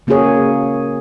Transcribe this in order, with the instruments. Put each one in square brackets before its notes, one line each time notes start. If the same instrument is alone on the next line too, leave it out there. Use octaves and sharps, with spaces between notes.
[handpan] C#3 A#3 C#4 F#4 G#4 C#5